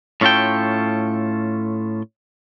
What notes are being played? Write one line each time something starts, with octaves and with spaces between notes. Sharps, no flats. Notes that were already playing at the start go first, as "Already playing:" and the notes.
A2 C#4 F4 A4 G5